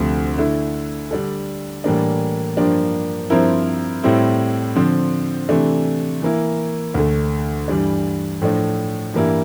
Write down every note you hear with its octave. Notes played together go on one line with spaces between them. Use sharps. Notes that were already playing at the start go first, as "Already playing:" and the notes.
Already playing: D2 C3 F3 A3
D3 A3 E4
D3 G3 D4 A4
A2 E3 G3 A#3 D4
G2 F3 A#3 D4 G4
G2 F3 C4 E4 A#4
A2 G3 C4 E4
D3 F3 C4
C3 E3 A3 D4
E3 A#3 E4
D2 D3 A3
G2 E3 G3 D4
A2 F3 A3 D4
G2 E3 G3 A#3 E4